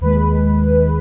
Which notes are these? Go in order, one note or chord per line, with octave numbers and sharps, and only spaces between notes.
D#2 D#3 G#3 B4